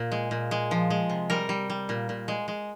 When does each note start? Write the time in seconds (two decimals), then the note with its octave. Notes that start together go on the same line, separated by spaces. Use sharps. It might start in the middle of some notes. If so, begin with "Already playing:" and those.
Already playing: A#2
0.12 G#3
0.31 A#2
0.51 G#3
0.71 F3
0.90 G#3
1.10 C3
1.30 G3 A#4
1.49 G3
1.70 G3
1.89 A#2
2.09 A#2
2.28 G#3
2.48 G#3